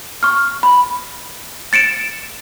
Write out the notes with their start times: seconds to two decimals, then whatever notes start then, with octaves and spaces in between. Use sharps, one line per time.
0.23 C#6 F6
0.63 B5
1.73 A6 C#7 D7 E7